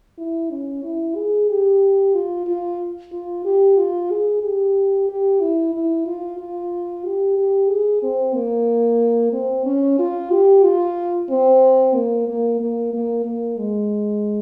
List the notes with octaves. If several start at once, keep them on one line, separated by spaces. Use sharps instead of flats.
E4
C#4
E4
G#4
G4
F4
F4
F4
G4
F4
G#4
G4
G4
E4
E4
F4
F4
G4
G4
G#4
C4
A#3
C4
C#4
F4
G4
F4
C4
A#3
A#3
A#3
A#3
A#3
G#3